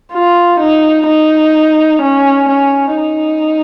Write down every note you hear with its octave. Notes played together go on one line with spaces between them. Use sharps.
F4
D#4
D#4
C#4
C#4
D#4